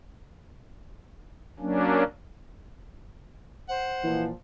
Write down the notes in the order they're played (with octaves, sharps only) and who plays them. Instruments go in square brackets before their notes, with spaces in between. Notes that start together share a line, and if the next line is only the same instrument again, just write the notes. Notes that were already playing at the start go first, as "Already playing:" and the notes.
[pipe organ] F#3 A#3 C#4 D4
[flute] C5 [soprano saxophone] F#5
[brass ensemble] A#2 F3 [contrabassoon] E3